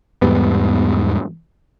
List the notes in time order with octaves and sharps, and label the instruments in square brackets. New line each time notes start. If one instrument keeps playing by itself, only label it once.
[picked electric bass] E2 G#2 G3 B3